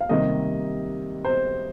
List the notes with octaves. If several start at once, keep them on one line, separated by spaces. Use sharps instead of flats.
F5
C3 D#3 G3 A#3 D#5
C5